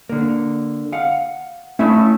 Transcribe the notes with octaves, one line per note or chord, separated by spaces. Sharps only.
D3 A#3
F5 F#5
A3 C#4 E4 E5